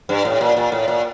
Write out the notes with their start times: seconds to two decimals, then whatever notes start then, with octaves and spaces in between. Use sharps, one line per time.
0.09 G2
0.25 A2
0.41 A#2
0.57 A#2
0.72 A2
0.88 A#2